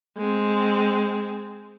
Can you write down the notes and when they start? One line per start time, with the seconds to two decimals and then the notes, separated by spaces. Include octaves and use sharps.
0.17 G#3 C4